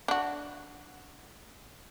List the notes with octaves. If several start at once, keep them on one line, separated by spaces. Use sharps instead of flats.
D4 F#4